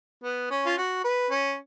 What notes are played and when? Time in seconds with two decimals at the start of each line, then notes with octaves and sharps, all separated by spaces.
0.24 B3
0.51 C#4
0.66 F4
0.78 F#4
1.04 B4
1.31 C#4